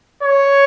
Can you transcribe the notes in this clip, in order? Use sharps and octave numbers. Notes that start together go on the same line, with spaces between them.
C#5